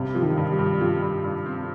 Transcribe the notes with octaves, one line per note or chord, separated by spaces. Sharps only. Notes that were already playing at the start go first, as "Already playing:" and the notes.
Already playing: G2 C3
F3
D#3
G2
G3
G2
F3
G2
G2
C4